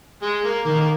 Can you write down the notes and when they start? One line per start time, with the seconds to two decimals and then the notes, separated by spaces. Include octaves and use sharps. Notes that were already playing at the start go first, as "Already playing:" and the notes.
0.22 G#3
0.44 A#3
0.65 D#3 A#3
0.81 A#3